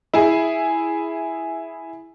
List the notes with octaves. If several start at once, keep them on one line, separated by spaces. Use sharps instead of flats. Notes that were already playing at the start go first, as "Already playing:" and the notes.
E4 G#4